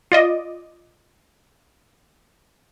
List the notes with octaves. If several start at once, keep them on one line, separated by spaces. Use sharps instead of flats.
F4 D5 D#5